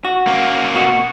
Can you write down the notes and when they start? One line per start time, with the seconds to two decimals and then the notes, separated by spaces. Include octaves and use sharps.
0.05 F#4
0.27 A#3 C#4
0.74 B2 F#4